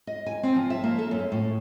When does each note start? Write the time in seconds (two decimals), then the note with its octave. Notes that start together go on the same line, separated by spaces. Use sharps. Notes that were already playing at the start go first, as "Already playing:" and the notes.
0.07 D#5
0.26 G#5
0.43 C4
0.56 F3
0.70 E5
0.84 A#3
0.98 A4
1.11 F#2
1.32 A2